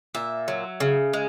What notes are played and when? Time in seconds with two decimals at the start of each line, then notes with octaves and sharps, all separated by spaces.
0.15 A#2 E5
0.48 F#3
0.80 C#3
1.13 G#3